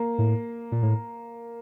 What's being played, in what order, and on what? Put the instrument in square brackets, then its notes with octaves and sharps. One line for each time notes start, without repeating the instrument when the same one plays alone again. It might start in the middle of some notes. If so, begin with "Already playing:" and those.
Already playing: [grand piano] A#3
[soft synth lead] A2
A#2
A2